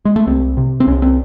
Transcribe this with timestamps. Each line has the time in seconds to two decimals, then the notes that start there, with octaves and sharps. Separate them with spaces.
0.05 G#3
0.16 A3
0.27 C2 C4
0.57 C3
0.80 C4
0.87 C2 C#4
1.02 C4